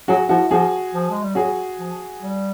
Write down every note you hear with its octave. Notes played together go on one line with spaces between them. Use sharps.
F#3 F#4 G#4
F3 E4 F#4
F3 F#4 G#4
F3
G#3
G3
F#3 F#4 G#4
F3
G3